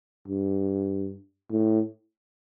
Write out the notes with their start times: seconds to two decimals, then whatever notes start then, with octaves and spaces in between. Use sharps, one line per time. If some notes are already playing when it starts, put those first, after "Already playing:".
0.28 G2
1.51 A2